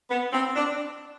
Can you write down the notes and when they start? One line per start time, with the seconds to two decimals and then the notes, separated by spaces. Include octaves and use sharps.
0.11 B3
0.33 C4
0.55 D4